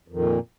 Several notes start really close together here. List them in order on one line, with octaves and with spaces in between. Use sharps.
F2 D#3 A#2